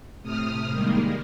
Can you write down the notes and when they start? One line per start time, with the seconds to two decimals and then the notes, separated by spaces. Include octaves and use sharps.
0.22 A2 C3 D#6 F6
0.70 D#3 G3 G#3 A#3